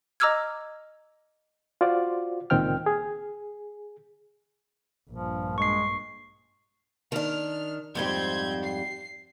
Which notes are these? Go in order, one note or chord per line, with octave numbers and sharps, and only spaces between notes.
D#5 A#5 D6 E6 F6 G#6
F4 F#4 C5 D5
C#2 A#2 D#3 C4 G5 F6
G#4
A#1 G2 F3
G#3 C#6 C7
D#3 D4 F6
F2 G#2 G3 C4 G6 G#6
C7